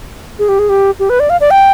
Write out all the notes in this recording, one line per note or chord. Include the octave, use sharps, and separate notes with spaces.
G#4
G4
G#4
G4
G4
B4
D5
F5
D5
G5